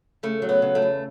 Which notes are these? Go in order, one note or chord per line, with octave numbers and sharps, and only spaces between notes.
C#3 A3
F#3
B3
C#3
A3
E2